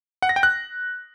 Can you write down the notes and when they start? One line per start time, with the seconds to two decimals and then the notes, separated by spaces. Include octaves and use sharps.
0.22 F#5
0.29 A#6
0.36 G5
0.43 F#6